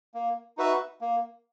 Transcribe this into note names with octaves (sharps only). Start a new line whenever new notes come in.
A#3
D#4 F#4 B4 E5
A#3